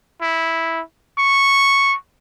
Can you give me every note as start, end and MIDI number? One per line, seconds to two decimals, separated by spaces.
0.21 0.81 64
1.18 1.95 85